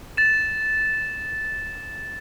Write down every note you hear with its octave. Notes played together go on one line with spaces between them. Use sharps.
A6 E7